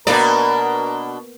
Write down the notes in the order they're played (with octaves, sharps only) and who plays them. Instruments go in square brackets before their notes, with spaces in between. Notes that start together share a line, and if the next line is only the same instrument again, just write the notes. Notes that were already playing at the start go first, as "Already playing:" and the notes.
[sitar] B2 D4 D5 [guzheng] A#3 B3 D#5 [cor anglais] A#4